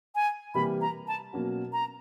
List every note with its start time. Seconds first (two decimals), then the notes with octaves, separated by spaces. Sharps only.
0.15 G#5
0.54 C3 E3 G3 A#3 B5
0.81 A#5
1.08 A5
1.33 B2 F#3 A#3 C#4 F#4
1.73 A#5